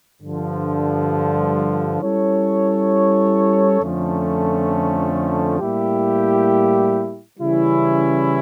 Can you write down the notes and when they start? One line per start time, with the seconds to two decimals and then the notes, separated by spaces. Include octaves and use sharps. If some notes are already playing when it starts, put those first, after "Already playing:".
0.21 G2 D3 F3
2.01 G3 C#4 E4 A4 C#5
3.80 F2 D3 F3 A3 C#4
5.60 A2 G3 A#3 E4 G4
7.39 C#3 E3 G3 C#4 E4